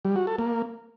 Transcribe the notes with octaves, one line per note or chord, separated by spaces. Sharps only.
G3
F#4
A4
A#3